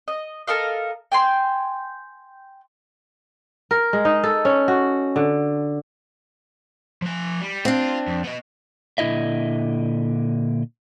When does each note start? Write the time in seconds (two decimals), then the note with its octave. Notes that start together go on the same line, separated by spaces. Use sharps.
0.08 D#5
0.47 A4 A#4 D#5 F5
1.12 G5 G#5 C6
3.71 A#4
3.93 G#3
4.05 D#4
4.24 A4
4.45 C#4
4.68 F#4
5.16 D3
7.02 F3 G#5
7.41 G3
7.65 C4 D4 F4 F5
8.07 F2
8.24 B3 D#5
8.98 A#2 D3 E4 D#5 E5